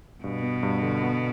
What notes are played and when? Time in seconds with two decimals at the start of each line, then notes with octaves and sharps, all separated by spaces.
0.24 G2 B2
0.43 B3
0.63 G2
0.83 D3
1.03 B3